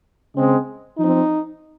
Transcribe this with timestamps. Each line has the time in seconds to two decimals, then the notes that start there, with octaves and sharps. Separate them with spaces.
0.35 C#3 G#3 C4
0.98 F3 C4 D#4